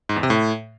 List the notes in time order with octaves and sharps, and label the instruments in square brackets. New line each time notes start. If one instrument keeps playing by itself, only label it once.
[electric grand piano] G#2
E2
C3
A2